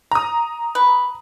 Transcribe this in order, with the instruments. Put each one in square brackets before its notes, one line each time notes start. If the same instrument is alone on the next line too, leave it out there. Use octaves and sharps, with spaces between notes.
[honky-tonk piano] A#5 D#6
[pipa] B4